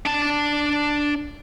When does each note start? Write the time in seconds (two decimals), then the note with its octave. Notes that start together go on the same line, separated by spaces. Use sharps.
0.06 D4 A5